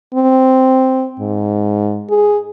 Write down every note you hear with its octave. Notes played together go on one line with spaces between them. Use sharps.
C4
G#2
G#4